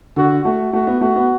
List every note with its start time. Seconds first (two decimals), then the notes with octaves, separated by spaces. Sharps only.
0.16 D3 F#4
0.45 A3 F#4
0.73 A3 F#4
0.87 B3
1.01 A3 F#4
1.16 B3